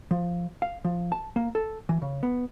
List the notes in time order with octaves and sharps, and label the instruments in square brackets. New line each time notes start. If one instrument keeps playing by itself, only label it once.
[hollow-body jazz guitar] F3
F5
F3
A5
A#3
A4
E3
C#3
B3